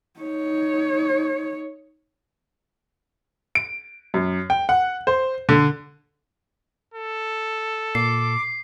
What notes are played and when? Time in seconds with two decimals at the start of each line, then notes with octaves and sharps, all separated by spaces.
0.20 D#4 C#5
3.55 D7
4.14 F#2
4.50 G5
4.69 F#5
5.07 C5
5.49 D3
6.94 A4
7.95 A#2 D6 C7